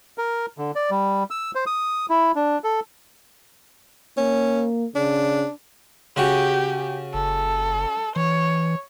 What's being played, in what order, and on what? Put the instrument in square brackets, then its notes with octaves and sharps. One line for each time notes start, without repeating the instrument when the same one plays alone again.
[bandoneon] A#4
D3
D5
G3
E6
C5
D#6
E4
D4
A4
[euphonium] A#3 [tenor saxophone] C#4
[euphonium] C#3 [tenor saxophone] D4
[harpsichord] C#3 F#4 [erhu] G4
[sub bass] F#1 [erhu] A4
[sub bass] E3 [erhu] C#5